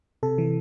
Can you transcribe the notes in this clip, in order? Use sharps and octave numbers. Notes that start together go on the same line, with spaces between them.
C3 A4
E3